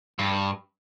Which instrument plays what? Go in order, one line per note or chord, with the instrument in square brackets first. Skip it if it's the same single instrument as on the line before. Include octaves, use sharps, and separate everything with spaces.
[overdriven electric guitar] G2